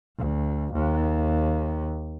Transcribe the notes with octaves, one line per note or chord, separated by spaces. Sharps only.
D2
D#2